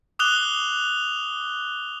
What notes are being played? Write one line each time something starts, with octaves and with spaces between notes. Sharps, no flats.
D6 D#6 F#6 F7 G7